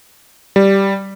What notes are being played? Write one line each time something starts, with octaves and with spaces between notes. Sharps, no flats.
G3